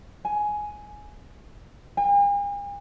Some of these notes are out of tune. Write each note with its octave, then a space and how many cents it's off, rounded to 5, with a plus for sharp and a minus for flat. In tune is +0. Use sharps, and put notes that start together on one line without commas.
G#5 +10
G#5 -45